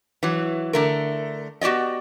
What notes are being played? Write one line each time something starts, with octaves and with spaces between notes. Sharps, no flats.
E3 F#3
D3 A3 A#4
B3 F#4 G4 D5 D#5